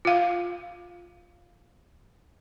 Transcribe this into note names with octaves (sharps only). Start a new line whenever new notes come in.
F4 F5